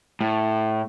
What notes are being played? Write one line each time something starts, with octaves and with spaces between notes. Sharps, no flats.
A2